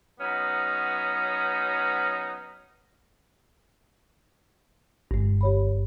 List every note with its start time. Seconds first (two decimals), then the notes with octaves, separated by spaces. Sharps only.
0.20 F#3 B3 C#4 D#4
5.11 G1 G2 G#3
5.41 G4 C#5 B5